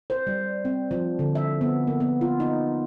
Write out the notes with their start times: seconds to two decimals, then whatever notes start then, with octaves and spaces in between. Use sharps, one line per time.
0.10 C5
0.27 G3
0.65 C4
0.91 F3
1.19 D3
1.35 E5
1.61 B3
1.87 A#3
2.00 B3
2.21 F4
2.40 D#4